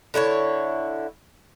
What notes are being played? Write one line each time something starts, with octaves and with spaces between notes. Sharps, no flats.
D3 E4 B4 C#5